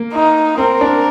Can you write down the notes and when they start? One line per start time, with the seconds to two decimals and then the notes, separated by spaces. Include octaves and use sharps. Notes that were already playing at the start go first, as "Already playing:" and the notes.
Already playing: A#3
0.13 D#4
0.58 C4 A#4
0.81 D4